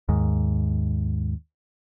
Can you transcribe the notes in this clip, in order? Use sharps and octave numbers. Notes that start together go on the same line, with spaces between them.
D#2 G#2